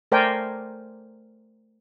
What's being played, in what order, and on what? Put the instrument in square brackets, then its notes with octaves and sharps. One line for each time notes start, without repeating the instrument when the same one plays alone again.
[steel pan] A3 A#4 C5 D5 G5 G#5